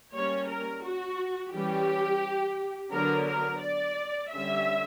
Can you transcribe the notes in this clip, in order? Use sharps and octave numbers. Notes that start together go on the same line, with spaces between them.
G3 A#3 C#4 C#5
A#4
F#4
E3 G3 C#4 G4
D3 F#3 B3 D4 A#4
A#4
D5
D3 G3 C#4 E5